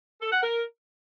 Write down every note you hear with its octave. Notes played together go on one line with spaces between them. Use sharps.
A4
F#5
A#4